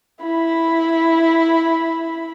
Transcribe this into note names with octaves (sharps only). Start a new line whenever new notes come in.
E4 B5